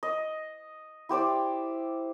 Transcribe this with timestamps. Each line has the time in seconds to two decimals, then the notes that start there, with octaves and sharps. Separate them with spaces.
0.03 D#5
1.09 E4 G4 C5 D5